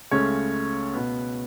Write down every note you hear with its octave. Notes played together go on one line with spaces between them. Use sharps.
C#2 C#3 A3 C#4 C#5
B2 B3